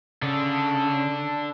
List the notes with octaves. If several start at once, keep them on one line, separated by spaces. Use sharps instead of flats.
C#3 D4 A4